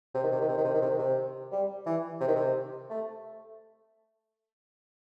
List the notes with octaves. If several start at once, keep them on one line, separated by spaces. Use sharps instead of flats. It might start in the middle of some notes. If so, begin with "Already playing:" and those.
C3
D#3
C3
D#3
C3
D#3
C3
D#3
C3
D#3
C3
G3
E3
C3
D#3
C3
A3